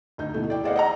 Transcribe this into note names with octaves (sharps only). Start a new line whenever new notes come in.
D2 D#4 G6
B2 E3 A3
E4 D5 G5
G#4 C5 D5 D#5 F5 F#5
D#5 F#5 A#5